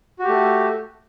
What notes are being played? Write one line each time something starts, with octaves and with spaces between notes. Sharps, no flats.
A3 F#4 G4